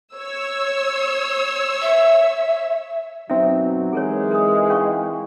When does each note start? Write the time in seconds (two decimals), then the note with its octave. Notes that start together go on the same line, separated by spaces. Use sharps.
0.15 C#5 E6
1.82 E5
3.30 F#2 B2 F#3 C4 D#4 E5
3.93 E3 G#3 G#4 A#4 C#5
4.31 A#4 D#6
4.70 C#4 F5 C#6